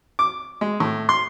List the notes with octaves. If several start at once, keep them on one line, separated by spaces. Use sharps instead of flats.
D6
G#3
A2
C6